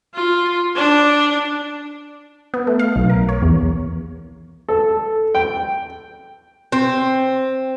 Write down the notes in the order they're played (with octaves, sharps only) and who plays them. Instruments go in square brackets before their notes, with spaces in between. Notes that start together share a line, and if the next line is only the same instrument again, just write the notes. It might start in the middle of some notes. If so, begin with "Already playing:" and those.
[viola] F4
D4
[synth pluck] B3
A3
F5
B1
A#4
C#5
E2
[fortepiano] A4
G5
[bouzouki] C4